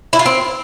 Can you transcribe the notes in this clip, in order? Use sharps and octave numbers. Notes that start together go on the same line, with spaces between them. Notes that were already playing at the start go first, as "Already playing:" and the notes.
E4
F4
C4